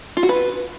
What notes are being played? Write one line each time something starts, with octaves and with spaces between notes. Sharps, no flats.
F4
F#4
B4